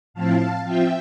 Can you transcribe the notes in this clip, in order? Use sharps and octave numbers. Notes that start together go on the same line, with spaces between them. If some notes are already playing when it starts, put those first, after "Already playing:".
A2 F3 C4 E4 F5 A5
F3 C4 F4 E5 G5